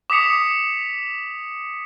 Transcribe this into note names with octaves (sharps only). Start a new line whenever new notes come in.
D6 D#6 B6 C#7 F7